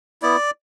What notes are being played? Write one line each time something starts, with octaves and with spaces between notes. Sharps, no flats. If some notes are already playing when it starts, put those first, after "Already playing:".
B3 E4 D5